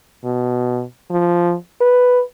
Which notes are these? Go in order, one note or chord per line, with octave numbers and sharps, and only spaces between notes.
B2
F3
B4